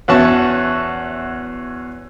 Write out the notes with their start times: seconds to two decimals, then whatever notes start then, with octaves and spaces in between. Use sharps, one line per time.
0.08 E2 C#4 F#4 E5 A5 C#6